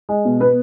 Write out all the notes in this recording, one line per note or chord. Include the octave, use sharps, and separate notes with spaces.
G#3
B2
B3 B4